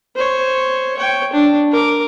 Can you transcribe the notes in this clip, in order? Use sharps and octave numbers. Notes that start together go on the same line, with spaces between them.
C5 C#5
C#5 G5
D4
A#4 D6